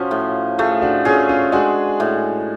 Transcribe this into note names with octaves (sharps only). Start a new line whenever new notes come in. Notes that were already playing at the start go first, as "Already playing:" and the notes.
Already playing: F3 C#4 F4 F#4
A2
A3 F4 G#4
D4 F#4
C#4 F4 G#4
C#4 F4
G#3 D4 F#4
A2